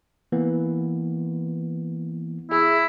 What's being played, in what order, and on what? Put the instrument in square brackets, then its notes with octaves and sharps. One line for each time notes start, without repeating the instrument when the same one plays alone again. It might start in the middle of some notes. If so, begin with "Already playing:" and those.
[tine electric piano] E3 A#3 B3
[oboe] E4 [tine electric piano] G#4 E5